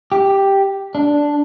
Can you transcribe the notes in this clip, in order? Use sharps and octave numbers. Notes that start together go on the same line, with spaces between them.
G4
D4